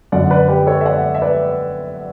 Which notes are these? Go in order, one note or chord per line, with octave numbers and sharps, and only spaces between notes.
F#2 D3 F#3 D5 F#5
B4 D5
G4 B4
A4 C#5
E5
D5 F#5
E5
B4 D5